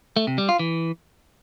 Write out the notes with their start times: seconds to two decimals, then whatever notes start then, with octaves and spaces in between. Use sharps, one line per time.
0.16 A3
0.27 C3
0.38 G3
0.49 F4
0.59 E3